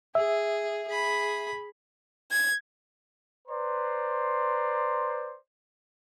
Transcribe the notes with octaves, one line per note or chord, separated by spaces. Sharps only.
G#4 E5
G#4 B5
G#6
B4 C5 D5 A#5 C6